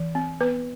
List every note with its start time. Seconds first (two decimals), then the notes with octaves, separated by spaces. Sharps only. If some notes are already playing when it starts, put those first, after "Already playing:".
Already playing: E3
0.15 C4
0.40 B3 B4